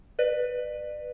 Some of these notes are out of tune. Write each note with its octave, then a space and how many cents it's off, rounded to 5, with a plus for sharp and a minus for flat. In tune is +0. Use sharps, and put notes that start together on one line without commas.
B4 +0 D5 +35